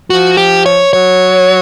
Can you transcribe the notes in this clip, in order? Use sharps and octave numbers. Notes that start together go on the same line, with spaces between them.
F3 F#4
G4
C#5
F#3 C#5